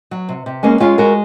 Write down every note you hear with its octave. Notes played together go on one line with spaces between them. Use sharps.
F#3
C3
C3
G#3 A#3 C#4
G#3 C#4 F4
G#3 F#4 A#4